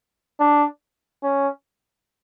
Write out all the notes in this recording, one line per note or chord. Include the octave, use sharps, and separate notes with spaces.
D4
C#4